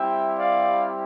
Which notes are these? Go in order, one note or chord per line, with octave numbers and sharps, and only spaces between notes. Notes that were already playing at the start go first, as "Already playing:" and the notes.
Already playing: G3 C4 E4 G4 E5 G5
D5 F5